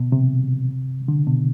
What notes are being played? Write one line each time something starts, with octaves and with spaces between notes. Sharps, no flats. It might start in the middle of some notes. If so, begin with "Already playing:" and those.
Already playing: B2
C3
D3
B2